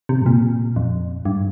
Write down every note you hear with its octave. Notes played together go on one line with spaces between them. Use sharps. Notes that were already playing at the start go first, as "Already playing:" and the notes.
C3
G2
A#2
F2
G2